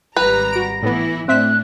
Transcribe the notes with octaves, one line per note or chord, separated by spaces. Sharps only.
G#1 G3 B4 A#5
F#4 A#6 D7
A2 E3 B3 E4
A2 C4 D4 E5 F#6 B6